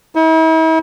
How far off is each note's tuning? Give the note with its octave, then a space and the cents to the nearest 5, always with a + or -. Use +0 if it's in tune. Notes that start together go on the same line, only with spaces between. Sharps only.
E4 -45